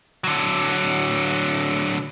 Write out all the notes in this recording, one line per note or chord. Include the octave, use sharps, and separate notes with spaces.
D3 F#3